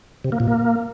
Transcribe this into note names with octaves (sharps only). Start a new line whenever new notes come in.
C3
A#3
A#2
A#3